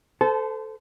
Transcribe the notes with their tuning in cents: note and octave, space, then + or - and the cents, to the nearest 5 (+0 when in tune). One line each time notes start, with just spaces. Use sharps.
A4 +0 C5 -30 A5 -25